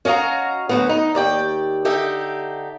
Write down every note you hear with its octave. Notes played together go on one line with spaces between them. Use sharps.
C#4 F#4 D#5 F5 A#5
D2 F#3 B3
D#4
D#2 D5 G5
D3 D#4 G4 E5